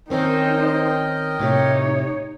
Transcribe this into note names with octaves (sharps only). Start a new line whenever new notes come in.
D#3 C4 C#4 D#4 A#4 C5 D#5 G5
A2 C3 D#4 G4 C#5